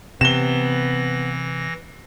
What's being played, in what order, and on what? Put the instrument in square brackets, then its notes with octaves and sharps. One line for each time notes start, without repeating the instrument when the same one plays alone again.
[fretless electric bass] C3 [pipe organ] E3 A#6 [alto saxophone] B3 [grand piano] E7 G7